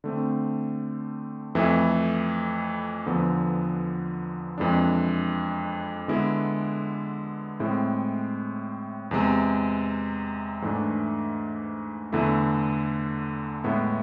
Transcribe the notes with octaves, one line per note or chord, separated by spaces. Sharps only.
D3 A3 C4
F2 E3 A3 E4
E2 D3 F3 B3
F2 E3 G#3 D4
D3 G#3 B3 E4
A2 G#3 C4 E4
E2 C3 G#3
G#2 E3 A3 D4
E2 D3 A3 E4
A2 G#3 B3 E4